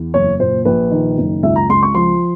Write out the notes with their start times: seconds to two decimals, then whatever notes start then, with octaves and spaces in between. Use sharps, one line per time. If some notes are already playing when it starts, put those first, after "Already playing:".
Already playing: E2
0.14 F#1 C#5
0.40 A#2 C5
0.65 A#1 B4
0.91 D#3
1.18 F#1
1.43 C#2 E5
1.56 A#5
1.69 C#2 C6
1.83 C#6
1.95 F3 C6